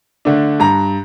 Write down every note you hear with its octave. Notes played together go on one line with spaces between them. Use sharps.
D3 A3 D4
G2 A#5